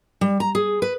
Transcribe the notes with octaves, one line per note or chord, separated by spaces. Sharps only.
G3
A#5
G#4
B4